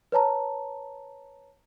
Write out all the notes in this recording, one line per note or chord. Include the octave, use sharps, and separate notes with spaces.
B4 C#5 A5 A#5